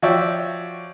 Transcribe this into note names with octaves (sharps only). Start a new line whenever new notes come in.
F3 F#4 C#5 D5 E5 G5